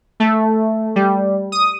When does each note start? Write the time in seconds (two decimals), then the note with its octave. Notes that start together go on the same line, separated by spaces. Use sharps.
0.20 A3
0.96 G3
1.52 D#6